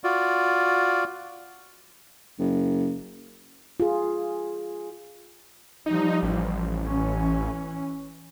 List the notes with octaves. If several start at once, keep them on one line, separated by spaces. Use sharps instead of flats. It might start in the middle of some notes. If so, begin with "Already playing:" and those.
F4 F#4 D5
F#1
F4 G#4
F3 G3 D#4
A1
E3 C#4